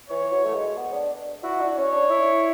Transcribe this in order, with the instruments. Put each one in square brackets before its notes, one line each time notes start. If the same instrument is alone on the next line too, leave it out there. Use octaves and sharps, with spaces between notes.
[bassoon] E3 [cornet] C#5
[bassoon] F#3
A3
G#3
B3
D4
[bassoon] E4 [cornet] F#4
[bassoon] D4
[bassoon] C#4 [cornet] C#5
[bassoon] D4
E4